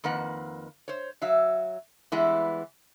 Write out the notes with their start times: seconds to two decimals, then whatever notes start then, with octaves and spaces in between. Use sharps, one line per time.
0.04 F2 D#3 A#3 B4 F#5
0.88 C5 C#5
1.22 F#3 E5 F5
2.12 E3 G3 G#3 B3 E4